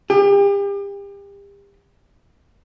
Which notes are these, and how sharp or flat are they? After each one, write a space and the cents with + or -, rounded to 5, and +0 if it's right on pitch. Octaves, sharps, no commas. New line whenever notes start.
G4 +35